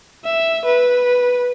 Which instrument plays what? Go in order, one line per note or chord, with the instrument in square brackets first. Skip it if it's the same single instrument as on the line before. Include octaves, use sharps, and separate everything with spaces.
[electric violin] E5
B4